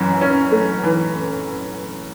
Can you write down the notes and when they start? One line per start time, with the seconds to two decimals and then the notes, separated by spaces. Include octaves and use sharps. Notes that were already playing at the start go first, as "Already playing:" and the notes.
Already playing: F#2 E3
0.21 C#4
0.51 A3
0.84 E3